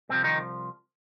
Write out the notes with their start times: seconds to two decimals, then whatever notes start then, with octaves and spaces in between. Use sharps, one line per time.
0.09 C2 C3 F3 C4
0.24 D#3 D#4